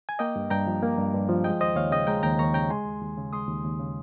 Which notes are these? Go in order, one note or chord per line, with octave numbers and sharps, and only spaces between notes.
G#5
A#3 D#5 G5
G2
G2 G5 A#5
F3
A#3
G2
G2
F3
G#3 D#5 G5
D#2 C5 D#5
D#2 C#5 F5
C#3 D#5 G5
G#3 G5 A#5
D#2 G5 A#5
D#2 A#5 C#6
C#3 G5 A#5
G#3 G#5 C6
D#2
D#2
C#3
G#3 C6 D#6
D#2
D#2
C#3